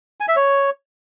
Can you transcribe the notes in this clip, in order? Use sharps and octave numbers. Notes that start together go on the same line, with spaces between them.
G#5
E5
C#5